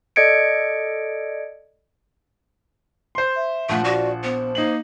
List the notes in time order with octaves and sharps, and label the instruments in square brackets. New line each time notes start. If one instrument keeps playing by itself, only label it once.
[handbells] A4 D5 D#5 G#6 C#7 D7
[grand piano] C5 C6
[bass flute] E5
[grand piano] A#1 F3 F#5 [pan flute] A3
[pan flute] F#4 [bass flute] D5
[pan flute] B3 [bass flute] C5
[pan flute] A#3 [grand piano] D#4 F#7